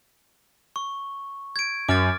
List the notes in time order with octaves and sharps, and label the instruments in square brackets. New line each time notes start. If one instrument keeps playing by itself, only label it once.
[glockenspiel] C#6
G#6 D7
[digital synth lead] F#2 [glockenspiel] D6 F6 A6